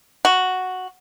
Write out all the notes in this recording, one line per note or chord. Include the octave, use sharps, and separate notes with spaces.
F#4